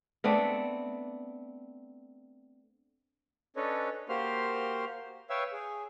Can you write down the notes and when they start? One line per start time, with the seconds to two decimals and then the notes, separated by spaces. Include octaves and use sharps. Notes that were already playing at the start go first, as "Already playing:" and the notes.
0.24 A3 B3 C4 D4
3.56 C#4 D4 A4 B4 C#5 D#5
4.09 A#3 F#4 G4 C5 C6 F6
5.30 B4 C#5 E5 F5 G5 E6
5.52 G#4